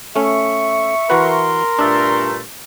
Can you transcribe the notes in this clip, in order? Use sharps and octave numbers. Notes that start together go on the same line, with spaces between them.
A3 C#4 E5 C#6
E3 F#4 A#4 B4 C6
G2 A#2 A3 D4 E5